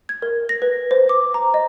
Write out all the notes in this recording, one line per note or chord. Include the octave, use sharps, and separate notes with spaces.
G#6
A#4
A#6
B4
C5
D6
A#5
D#5